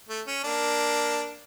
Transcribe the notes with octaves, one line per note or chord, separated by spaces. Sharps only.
A3
C#4
A#3 D4